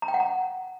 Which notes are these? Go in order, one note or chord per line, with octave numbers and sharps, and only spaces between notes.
A#5
G5
F#5
A#5